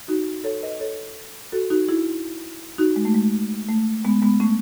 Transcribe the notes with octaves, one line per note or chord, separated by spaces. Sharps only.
D#4 F#4
A4 C#5
B4 D#5
A4 C#5
F#4 A4
D#4 F#4
E4 G#4
D#4 F#4
G#3
A3
G#3
A3
G#3 B3
G#3 B3
A3 C#4